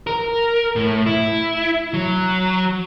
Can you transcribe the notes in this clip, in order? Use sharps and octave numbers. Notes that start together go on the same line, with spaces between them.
A#4
A2
E4
F#3